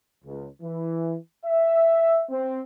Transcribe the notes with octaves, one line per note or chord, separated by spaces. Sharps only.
C#2
E3
E5
C4